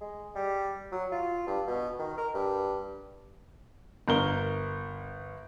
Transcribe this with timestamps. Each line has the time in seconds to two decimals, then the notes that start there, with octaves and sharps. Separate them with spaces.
0.01 G#3
0.35 G3
0.92 F#3
1.12 F4
1.47 G2
1.67 B2
1.99 D#3
2.17 A#4
2.34 G2
4.08 G1 A#4 G7